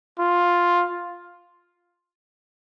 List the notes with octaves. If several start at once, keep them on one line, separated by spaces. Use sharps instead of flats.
F4